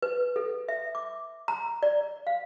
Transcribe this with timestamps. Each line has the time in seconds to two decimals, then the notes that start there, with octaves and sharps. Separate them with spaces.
0.02 B4
0.36 A4
0.68 E5
0.95 D6
1.48 A#5
1.83 D5
2.27 F5